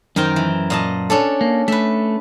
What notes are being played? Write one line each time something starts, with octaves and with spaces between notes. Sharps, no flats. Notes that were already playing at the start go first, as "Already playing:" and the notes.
F#2 D#3 A#4 C5 G5
E3
A#2 D#5 A5
C#4 D4 A4
A#3
A3 B4 E5